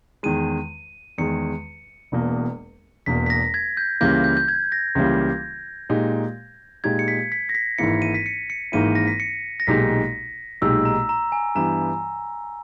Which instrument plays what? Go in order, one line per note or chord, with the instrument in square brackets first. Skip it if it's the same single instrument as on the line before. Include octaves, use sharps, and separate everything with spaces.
[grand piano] E2 D#3 G#3 [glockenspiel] D#7
[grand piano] E2 D#3 G#3 [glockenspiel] C#7
[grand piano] E1 E2 B2 A#3
[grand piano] E1 E2 B2 A#3 [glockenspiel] B6
[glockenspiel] B6
A#6
G#6
G6
[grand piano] C#2 C#3 E3 G3 A#3 [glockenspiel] G6
[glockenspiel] G6
G6
G#6
A#6
[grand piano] C#2 C#3 E3 G3 A#3
A#2 G#3 D#4 G4
[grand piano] A#2 G#3 D#4 G4 [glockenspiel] G#6
[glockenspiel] C#7
B6
B6
A#6
B6
[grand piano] G#1 G#2 E3 A#3 E4 [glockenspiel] C#7
[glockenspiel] D#7
B6
C#7
C#7
[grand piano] G#1 G#2 E3 A#3 E4 [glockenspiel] D#7
[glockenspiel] A#6
B6
C#7
A#6
[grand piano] B1 A#2 G#3 D#4 G4 [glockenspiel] B6
[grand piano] B1 A#2 G#3 D#4 G4 [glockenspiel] E6
[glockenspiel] A#5
A#5
G#5
[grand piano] G2 E3 G3 B3 [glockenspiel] A#5